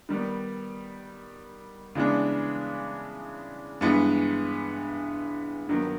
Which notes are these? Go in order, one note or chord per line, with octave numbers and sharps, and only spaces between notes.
D#3 G3 B3
C#3 E3 G#3 B3 D4
G2 E3 G#3 B3
G2 D#3 F#3 B3